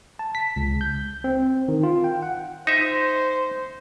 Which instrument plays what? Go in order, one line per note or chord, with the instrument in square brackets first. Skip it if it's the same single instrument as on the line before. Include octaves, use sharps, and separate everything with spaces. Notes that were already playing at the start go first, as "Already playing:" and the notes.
[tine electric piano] A5
B6
C#2
G6
C4
D#3
F4
G5
F#5
[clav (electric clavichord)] D#4 E5 [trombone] C5